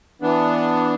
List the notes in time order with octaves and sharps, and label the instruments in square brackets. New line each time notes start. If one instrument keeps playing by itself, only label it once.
[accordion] E3 B3 D4